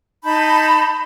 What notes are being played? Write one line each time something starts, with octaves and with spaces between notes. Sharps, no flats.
D#4 A5 B5 G6